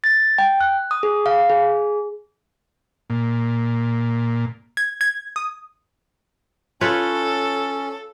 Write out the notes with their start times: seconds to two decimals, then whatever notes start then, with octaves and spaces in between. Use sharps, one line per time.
0.04 A6
0.38 G5
0.61 F#6
0.91 D#6
1.03 G#4
1.26 F5
1.50 G#4
3.10 A#2
4.77 G#6
5.01 G#6
5.36 D#6
6.81 C#4 F4 A4 B4 C#5